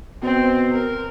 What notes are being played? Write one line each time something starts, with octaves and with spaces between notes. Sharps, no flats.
B2 C4
A#4